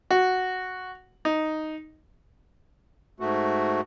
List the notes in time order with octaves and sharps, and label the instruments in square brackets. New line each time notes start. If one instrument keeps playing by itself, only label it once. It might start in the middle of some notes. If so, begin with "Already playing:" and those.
[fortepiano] F#4
D#4
[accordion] G#2 A3 F#4